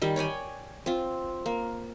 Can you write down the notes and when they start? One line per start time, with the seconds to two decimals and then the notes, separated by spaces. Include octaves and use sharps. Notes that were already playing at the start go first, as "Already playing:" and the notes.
0.02 D#3 G3 G4
0.16 C#5 D5 G5 G#5
0.86 C4 F4
1.46 A#3